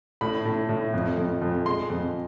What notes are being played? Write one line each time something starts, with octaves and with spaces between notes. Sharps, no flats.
A2 B5
A2
A2
F2
F2
F2
G#3 C6
F2